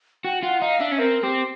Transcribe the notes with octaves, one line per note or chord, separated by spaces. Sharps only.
F#4 G5
F4 F#5
D#4 F5
D4 E5
C#4
C4 A#4
C4 G4